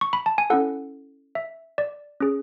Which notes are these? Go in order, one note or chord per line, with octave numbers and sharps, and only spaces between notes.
C#6
B5
A5
G#5
C#4 E4 A4 F#5
E5
D5
C#4 G#4